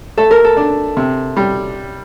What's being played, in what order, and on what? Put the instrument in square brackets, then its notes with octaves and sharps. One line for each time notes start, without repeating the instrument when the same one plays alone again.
[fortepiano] A3 [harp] A4
[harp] A#4
A4
[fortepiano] D4
C3
G3